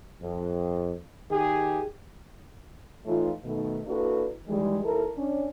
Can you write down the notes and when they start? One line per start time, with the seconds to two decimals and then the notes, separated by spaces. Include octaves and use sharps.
0.22 F2
1.31 D#3 G4 G#4
3.05 A2 E3 A3 D#4 F4
3.44 B2 D#3 A3
3.87 A#3 D4 E4 F#4 A4 B4
4.47 D#3 E3 G3 G#3
4.84 D#2 E4 A4 A#4
5.16 C#4 D4